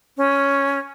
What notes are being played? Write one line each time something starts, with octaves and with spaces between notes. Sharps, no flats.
C#4